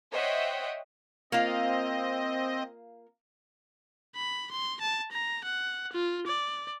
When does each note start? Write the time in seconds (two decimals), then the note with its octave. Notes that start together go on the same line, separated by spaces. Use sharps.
0.12 C5 C#5 D#5 E5 F#5 G5
1.32 A#3 C4 F4 D#5
4.16 B5
4.51 C6
4.81 A5
5.12 A#5
5.45 F#5
5.93 F4
6.27 D5